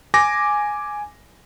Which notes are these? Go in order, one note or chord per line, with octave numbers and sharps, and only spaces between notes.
G#5 D6 A#6